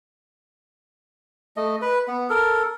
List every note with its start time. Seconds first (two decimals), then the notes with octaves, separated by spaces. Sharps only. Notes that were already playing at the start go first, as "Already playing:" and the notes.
1.57 A3 D#5
1.82 B4
2.08 B3
2.30 A4 A#4